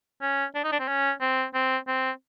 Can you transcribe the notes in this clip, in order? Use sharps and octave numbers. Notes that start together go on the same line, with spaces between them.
C#4
D4
D#4
D4
C4
C#4
C4
C4
C4